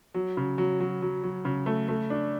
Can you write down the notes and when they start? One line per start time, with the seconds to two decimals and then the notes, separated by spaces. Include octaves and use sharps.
0.14 F#3
0.37 C#3
0.58 F#3
0.80 F#3
1.02 F#3
1.23 F#3
1.45 C#3
1.66 A3
1.88 A3
2.10 D4